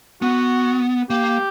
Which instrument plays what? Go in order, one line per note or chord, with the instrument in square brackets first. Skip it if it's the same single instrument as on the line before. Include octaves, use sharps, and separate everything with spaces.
[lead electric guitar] B3 [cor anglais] F#4
[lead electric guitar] A#3 [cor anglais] G4